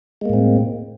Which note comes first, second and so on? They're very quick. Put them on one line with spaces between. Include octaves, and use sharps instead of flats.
G#3 A#3 A2 C4